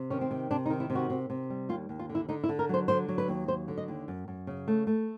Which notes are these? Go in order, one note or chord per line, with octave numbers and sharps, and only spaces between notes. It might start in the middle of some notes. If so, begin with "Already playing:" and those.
Already playing: C3
D#3 C#4
C4
C3
C3 D4
D#4
D#3
E4
C3
F#4
C3
C3
G3
D#2 F4
D#2
F4
D3
E4
D3 D#4
E4
D3
A#4
F#3 C5
D3 C5
F#3
B4
D#2
F#3 C5
D3
D#5
D#2
F#2
F#2
C#3
A3
A3